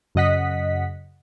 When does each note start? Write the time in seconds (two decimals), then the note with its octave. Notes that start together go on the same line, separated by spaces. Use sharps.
0.15 F#2 C#3 D#5 F#5 B6